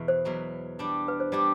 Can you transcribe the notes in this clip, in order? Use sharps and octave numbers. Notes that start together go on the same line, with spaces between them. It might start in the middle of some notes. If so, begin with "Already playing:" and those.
Already playing: E2 B2
C5
E2 B2 F#3
G3 D4 G4
B4
C5
G3 D4 G4 D5